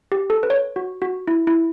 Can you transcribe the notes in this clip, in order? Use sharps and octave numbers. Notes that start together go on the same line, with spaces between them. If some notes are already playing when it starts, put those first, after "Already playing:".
G4
A4
B4
C#5
F#4
F#4
E4
E4